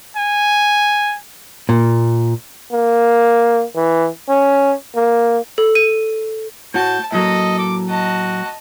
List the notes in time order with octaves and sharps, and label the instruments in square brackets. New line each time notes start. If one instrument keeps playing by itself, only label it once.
[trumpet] G#5
[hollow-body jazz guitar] A#2
[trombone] A#3
E3
C#4
A#3
[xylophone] A4
D#7
[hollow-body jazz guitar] A2 F#4 [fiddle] A5 [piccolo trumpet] G6
[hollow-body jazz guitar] A2 F#3 A#3 [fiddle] A4 [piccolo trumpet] D#5
[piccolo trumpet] D6
[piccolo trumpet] F#4 [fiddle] D#5 A5